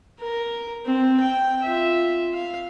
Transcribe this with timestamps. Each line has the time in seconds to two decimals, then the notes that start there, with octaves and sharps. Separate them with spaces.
0.20 A#4
0.86 C4
1.20 G5
1.62 F4 E5
2.34 F5